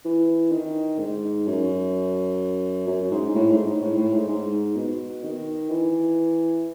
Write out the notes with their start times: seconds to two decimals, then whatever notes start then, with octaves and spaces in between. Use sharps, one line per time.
0.05 E3
0.52 D#3
0.99 G#2
1.47 F#2
2.87 F#2
3.11 G#2
3.29 G#2
3.35 A2
3.51 G#2
3.66 G#2
3.82 A2
3.98 A2
4.13 G#2
4.28 G#2
4.76 B2
5.23 D#3
5.71 E3